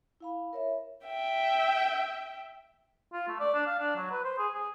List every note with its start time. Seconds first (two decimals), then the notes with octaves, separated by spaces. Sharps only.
0.20 E4 F5 B5
0.53 A#4 C#5 E5
1.05 E5 G5
3.13 F4
3.29 A3
3.40 D5
3.54 D4
3.67 F5
3.79 D4
3.97 F#3
4.11 B4
4.24 C5
4.38 G#4
4.54 G#4